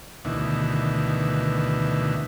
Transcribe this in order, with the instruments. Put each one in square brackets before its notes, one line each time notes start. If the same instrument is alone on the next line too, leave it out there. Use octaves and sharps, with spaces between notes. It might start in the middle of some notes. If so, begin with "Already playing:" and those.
[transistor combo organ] D2 B2 D#3 E3